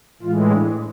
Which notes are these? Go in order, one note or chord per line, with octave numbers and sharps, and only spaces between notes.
A2 E3 G#3 F4
D4